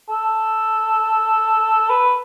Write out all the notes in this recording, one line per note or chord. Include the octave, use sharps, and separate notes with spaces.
A4
B4